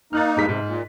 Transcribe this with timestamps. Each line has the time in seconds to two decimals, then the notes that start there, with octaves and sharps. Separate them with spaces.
0.13 A#3 D#4 F6 F#6 A6
0.36 G2 G#3 B6
0.49 G#2 C3
0.66 A#2